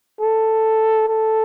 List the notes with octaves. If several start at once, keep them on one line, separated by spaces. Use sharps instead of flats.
A4
A4